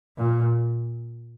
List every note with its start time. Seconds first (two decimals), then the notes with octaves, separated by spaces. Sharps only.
0.17 A#2